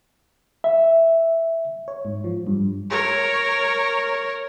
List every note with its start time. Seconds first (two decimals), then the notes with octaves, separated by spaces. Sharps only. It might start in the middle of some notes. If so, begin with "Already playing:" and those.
0.64 E5
1.88 C#5
2.05 G#2
2.24 F3
2.47 G2
2.90 A#4 C#5